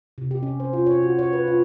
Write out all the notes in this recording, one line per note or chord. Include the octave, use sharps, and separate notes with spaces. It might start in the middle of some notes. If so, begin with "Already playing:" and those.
C3
G4
C#4
C5
F4
C#5
F#4
C#5
B4
F4